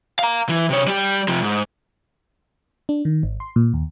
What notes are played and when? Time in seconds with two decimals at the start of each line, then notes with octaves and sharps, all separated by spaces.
0.19 F5 A#5
0.49 E3
0.70 C3 C#5
0.88 G3 G4
1.28 C3 F3
1.42 G#2
2.89 D4
3.05 D#3
3.23 G#1
3.40 C6
3.56 A#2
3.74 D#2